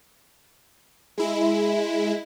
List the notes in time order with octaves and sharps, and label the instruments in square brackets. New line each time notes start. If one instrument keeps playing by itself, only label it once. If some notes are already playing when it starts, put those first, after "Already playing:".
[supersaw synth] G#3 E4